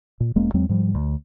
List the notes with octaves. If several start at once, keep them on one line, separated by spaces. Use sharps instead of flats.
A#2
E1 G#3 A#3 C#4
E2 F#3 G#3 C4
G#2 F3 G3
D2